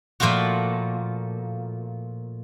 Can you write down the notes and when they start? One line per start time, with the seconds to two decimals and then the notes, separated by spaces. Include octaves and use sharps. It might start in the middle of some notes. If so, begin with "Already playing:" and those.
0.20 A#2 F3 A3 F4 F#4